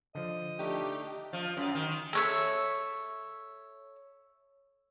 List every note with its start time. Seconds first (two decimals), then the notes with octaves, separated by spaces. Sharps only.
0.15 D3 F3 D#5
0.59 A3 D4 D#4 G4
1.33 F3
1.57 F#2
1.75 D#3
2.13 A4 C#5 E5